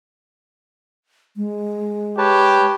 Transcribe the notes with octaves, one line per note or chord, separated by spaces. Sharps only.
G#3
G4 B4 C#5 A5